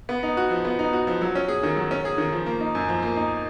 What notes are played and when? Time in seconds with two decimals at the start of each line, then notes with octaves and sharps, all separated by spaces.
0.09 B3
0.23 D#4
0.37 F#4
0.51 F3
0.65 B3
0.79 D#4
0.93 F#4
1.07 F3
1.22 F#3
1.35 C#4
1.48 G#4
1.63 D#3
1.76 F#3
1.91 C#4
2.05 G#4
2.18 D#3
2.32 F3
2.46 A#3
2.61 D#4
2.75 F#2
2.89 F3
3.02 A#3
3.16 D#4